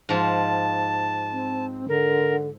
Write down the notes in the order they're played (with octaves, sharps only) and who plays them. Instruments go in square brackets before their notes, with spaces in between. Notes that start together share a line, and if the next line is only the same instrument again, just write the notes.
[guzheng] G#2 F3 [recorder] A5
[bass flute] C4
[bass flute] D3 [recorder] A#4